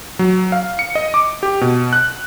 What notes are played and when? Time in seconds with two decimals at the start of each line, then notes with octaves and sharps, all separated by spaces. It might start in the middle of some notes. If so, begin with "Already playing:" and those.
0.19 F#3
0.52 F5
0.79 C#7
0.95 D#5
1.14 D6
1.43 G4
1.61 B2
1.93 F#6